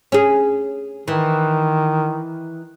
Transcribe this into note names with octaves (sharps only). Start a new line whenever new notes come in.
C#4 G#4
D#3 E3